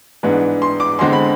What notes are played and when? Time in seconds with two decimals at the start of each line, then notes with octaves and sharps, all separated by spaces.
0.23 G#2 E3 B3 D4
0.62 C6
0.80 D6
0.99 E2 D3 G#3 C4 C6
1.13 B5